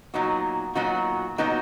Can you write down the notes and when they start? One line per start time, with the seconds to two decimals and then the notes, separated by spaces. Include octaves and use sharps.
0.14 A#2 F#3 B3 D#4 F#4
0.75 A#2 F#3 B3 D#4 F#4
1.38 A#2 F#3 B3 D#4 F#4